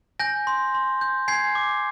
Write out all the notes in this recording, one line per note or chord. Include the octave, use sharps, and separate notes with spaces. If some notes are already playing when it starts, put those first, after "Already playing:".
G#5 G6 A#6
C6
C6
G6
G#5 G#6 C7
D6